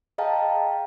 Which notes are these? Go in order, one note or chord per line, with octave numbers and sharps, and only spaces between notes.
G#4 D#5 F5 G5 A5 A#5